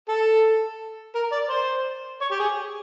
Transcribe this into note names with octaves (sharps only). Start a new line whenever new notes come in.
A4
A#4
D5
C5
C#5
G4
G#4